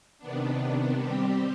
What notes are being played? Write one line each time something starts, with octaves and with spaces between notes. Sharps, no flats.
C3 D#3 B3 D4
G3 C4 G4